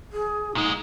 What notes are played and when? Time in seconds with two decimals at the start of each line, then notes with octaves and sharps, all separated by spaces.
0.12 G#4
0.55 A#2 G#3 D#4